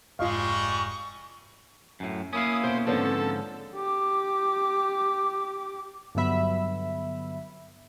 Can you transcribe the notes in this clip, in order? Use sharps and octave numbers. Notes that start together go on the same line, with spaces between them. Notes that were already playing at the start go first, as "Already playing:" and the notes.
F1 G#2 G3 G#3 F4 D#5 F5 C#6
F#2 A2
A#3 C#4 E4 F5 D#6
B2 C5 D7
G#2 D3 F3 C4 C#4 A4 B4
G4 D6
G2 D3 F#3 B3 E5 B5